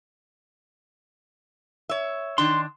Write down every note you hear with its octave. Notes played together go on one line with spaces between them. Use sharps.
C#5 E5
D#3 D4 C6